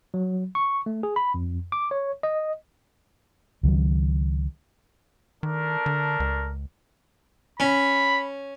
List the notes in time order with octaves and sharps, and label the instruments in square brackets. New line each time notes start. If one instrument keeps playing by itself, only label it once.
[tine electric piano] F#3
C#6
A3
G#4
B5
F2
D6
C#5
D#5
[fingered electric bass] C#2 D#3 F#3
[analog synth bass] D#3 [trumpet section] A3 D4 A#4
[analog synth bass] D3
C#2
[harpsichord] C#4 [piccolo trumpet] B5